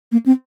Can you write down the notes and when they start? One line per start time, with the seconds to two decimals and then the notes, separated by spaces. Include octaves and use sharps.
0.12 A#3
0.26 C4